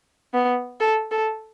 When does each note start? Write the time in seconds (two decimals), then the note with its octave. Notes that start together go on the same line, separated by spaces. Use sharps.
0.34 B3
0.81 A4
1.11 A4